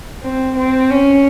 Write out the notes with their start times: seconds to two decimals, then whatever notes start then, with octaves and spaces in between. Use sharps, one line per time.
0.23 C4
0.56 C4
0.90 C#4